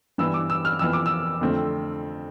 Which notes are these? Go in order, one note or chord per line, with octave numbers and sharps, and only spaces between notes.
G2 E3 B3 E6
D6
E6
F6
F2 E3 B3 E6
D6
E6
F2 D3 A3 C4